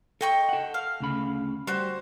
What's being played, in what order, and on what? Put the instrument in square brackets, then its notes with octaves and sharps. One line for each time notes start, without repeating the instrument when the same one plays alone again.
[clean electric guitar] A4 [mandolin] D#5 G5 C#6
[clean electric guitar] A4 F#5
[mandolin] F5
[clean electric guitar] D2 C#3 B5
[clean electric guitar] G3 [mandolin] F#4 C5